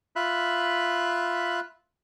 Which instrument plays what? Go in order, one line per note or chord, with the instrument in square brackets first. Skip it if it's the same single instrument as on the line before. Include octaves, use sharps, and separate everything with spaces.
[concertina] F4 E5 B5 F#6